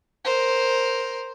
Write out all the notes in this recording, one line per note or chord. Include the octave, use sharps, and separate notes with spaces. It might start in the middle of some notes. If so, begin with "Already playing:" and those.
A#4 C5